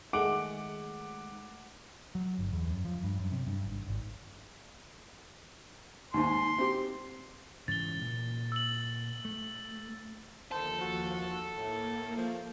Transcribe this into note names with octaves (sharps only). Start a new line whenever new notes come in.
D#3 G#3 A3 F#5 D6 D7
F#3
G1
E2
F#2
F3
G2
F#2
C3
G2
G#1
G#1
D#2 G#2 C6
C4 G4
G#2 C#3 E3 A6 G7
A#2
E6 F#7
A3
D#2 D3 D#3 F3 A4 C5
F#4
A2 A#3
F3 A3